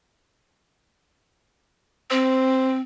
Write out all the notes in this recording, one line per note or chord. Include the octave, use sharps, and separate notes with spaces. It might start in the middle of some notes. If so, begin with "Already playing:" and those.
C4 C5